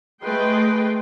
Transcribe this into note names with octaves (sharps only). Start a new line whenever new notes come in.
A3 G#4 B4 D#5 G5 C6